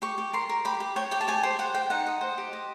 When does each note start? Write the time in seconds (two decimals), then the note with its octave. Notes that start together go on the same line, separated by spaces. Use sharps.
0.02 G4 C#6
0.18 G4
0.33 A#4 C6
0.49 A#4
0.65 G4 B5
0.80 G4
0.96 C#5 G5
1.11 G4 G5
1.21 A5
1.28 G4 G#5
1.43 C5 G5
1.59 C5 F#5
1.74 C5 G5
1.90 D#4 F#5
2.06 D#5
2.21 C5
2.38 G4
2.53 D#5